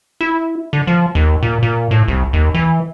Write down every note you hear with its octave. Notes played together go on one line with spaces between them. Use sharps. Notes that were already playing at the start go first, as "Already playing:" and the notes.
E4
D3
F3
D#2
A#2
A#2
A2
C2
D#2
E3